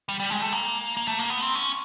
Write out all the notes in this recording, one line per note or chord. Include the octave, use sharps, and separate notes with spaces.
G3
G3
G#3
A3
A#3
A#3
A3
A#3
B3
C4
C#4